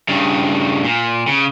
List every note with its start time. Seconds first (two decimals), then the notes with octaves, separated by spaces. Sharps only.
0.08 G2 C#3
0.84 A#2
1.27 C#3